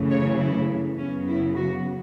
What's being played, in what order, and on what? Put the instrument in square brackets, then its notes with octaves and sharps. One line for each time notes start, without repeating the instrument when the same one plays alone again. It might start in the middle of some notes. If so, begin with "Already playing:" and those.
Already playing: [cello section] F#2 C#3 E3 A3
C#5
E4
F#2 C#3 F#3 B3 C#4
E4
F#4